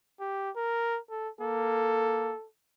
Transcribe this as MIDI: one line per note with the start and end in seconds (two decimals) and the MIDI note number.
0.20 0.50 67
0.56 0.99 70
1.10 1.29 69
1.41 2.33 58
1.41 2.47 69